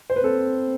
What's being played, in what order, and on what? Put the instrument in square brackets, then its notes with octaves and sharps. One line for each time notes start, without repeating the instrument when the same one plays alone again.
[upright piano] C5
B4
[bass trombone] C4 [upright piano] A4